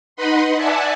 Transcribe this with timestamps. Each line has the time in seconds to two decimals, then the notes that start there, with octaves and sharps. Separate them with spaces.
0.16 D#4 B4 D#5 F#5 B5 C6
0.56 D5 E5 F#5 G#5 A5